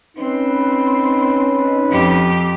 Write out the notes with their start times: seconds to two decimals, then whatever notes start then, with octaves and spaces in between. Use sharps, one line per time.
0.18 C4 C#4 D#4 B4
1.90 F2 G4